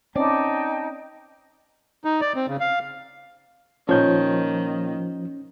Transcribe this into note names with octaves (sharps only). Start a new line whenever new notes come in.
C4 C#4 D#4 D5 G5 A5
D#4
D5
C4
C#3
F5
A#2 D#3 F3 C#4 C#5 G6